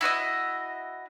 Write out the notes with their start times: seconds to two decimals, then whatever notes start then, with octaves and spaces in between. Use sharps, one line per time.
0.01 E4 F#4 C#5 D#5